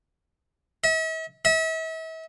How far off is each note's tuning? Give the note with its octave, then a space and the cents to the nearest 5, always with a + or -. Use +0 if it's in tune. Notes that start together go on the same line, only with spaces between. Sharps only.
E5 -45
E5 -40